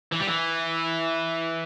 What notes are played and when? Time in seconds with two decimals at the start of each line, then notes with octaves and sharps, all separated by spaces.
0.12 E3
0.20 G3
0.27 E3